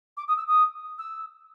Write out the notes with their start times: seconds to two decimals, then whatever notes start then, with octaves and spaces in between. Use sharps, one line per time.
0.17 D6
0.27 D#6
0.37 E6
0.47 D#6
0.98 E6